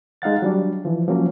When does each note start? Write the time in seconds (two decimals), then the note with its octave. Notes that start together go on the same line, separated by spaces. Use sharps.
0.22 G#3 D#4 F5 F#5 A6
0.42 F#3 G3 D4
0.85 E3 F3
1.08 F3 F#3 A#3 C#4 F#4